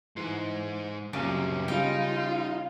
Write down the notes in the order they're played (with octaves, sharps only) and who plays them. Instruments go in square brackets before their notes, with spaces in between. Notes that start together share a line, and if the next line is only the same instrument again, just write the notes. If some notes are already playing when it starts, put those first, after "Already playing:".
[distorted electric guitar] G#2 C5 [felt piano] E3
[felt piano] C2 A#2 F#3 [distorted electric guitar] F#2 G4 [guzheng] C#3
[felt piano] C#3 G3 [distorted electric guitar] D#4 [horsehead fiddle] F4 F5 [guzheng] G5